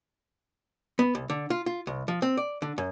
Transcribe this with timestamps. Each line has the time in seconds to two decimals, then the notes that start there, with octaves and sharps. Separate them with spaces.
0.99 B3
1.15 C2
1.30 D3
1.50 F4
1.66 F4
1.87 C2
2.08 F3
2.22 C4
2.37 D5
2.62 D3
2.78 F#2